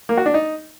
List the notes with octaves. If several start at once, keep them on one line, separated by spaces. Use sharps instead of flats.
A#3
F#4
D4
D#4